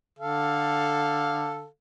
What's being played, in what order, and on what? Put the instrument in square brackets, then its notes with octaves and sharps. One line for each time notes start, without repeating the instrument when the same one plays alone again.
[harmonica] D3 A4 F5